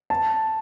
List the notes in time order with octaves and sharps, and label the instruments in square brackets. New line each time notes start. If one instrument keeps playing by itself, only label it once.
[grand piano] A5